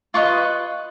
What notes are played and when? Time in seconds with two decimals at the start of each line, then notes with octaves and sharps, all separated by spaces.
0.14 F4 B4 D#5 C#6